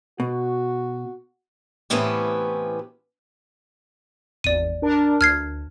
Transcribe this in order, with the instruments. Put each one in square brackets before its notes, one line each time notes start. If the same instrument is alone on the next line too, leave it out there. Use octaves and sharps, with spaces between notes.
[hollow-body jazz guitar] B2 [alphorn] F#4
[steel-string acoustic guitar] A2 C3 E3 B3 C#4 G4
[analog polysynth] G#1 E2 [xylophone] D5 D#7
[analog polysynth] D4 A#4 A5
[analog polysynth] D2 [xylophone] F6 G#6 C7